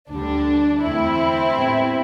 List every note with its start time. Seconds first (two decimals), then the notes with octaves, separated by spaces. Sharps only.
0.11 D2 D3 G3 D4
0.82 E2 D3 A3 C4 E4
1.55 A2 G3 B3